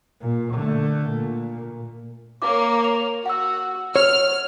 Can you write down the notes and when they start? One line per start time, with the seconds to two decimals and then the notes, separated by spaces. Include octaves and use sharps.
0.21 A#2
0.54 D3 A3
1.11 A#2
2.42 A#3 C#5 D6
2.84 F7
3.26 F#4 F#5 E6
3.96 C#5 F6